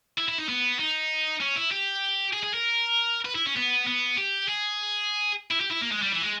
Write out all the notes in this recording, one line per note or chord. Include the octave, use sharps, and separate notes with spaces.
E4
E4
D#4
B3
D#4
C#4
E4
G4
G#4
G#4
A#4
B4
E4
C#4
B3
B3
G4
G#4
E4
G4
E4
A#3
G#3
G3
E3
G#3